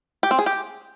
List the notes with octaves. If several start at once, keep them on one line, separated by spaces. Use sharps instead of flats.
G4
C4
G#4
G4